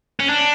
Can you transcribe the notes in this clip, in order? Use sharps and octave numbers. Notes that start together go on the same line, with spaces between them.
C#4
D4